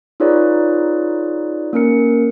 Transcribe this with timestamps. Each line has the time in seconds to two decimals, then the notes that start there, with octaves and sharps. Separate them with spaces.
0.20 D#4 F4 G#4 B4 C#5 D5
1.73 A#3 C#4 A#4 C#7